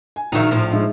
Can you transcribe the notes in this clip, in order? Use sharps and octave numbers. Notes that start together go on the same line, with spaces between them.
G#5
A#1 D#3 F#3 D#4 E5
A2 F3
G#3 D#4 E5